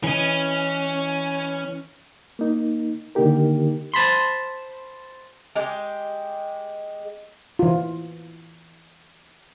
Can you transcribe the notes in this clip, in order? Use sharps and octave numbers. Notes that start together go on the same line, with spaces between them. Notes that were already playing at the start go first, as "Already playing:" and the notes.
E3 C#4 D#5
A#3 D#4
D3 D#3 A#3 D#4 G4 A#4
C5 A5 B5 C6
G#3 G4
E3 F4